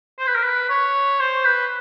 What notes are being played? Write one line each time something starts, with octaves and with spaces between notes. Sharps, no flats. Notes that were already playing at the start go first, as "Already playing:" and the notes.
C5
B4
A#4
B4
C#5
C5
B4